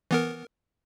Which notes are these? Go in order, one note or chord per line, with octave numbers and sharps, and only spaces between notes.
E3 B3 A#4